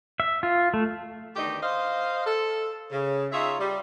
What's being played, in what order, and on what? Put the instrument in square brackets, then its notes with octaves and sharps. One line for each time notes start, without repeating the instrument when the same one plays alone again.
[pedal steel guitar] E5
F4
A3
[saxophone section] E2 D3 D#3 A3 D#4 G4
C5 D#5 F5
A4
C#3
D#4 F4 G#4 C#5 E5
G3